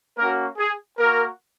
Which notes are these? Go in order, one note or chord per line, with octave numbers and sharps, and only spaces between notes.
A#3 C#4 F#4 A#4
G#4
A#3 F#4 A#4